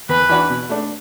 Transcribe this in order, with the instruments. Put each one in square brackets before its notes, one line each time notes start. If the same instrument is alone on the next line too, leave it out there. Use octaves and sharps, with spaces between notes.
[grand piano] E2 [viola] B4
[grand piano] E3 D4 F#4
B2
A3 D4